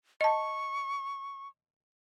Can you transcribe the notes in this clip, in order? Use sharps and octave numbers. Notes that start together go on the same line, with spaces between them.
D#5 A5 C#6